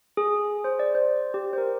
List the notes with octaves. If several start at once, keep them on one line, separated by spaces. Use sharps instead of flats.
G#4
C5
D5
C5
G4
C5
A#4